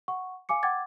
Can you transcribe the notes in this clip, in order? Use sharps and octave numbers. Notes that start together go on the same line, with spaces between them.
F#5 C#6
F5 G#5 D6 C#7
F#5 G5 D6 G#6 A6